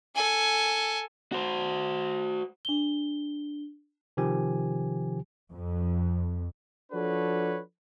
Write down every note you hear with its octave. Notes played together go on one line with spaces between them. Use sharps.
A4 G#5
F#4 C5
D4 G7
C3 D#3 F3 G4 G#5
F2
F3 D4 F#4 A4 B4 C#5